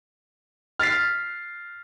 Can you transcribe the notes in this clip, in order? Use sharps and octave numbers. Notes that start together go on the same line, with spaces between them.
F6 A6 B6 C7